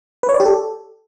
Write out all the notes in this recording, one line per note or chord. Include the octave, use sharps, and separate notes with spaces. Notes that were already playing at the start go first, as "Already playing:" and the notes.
B4
C#5
D5
G4
A4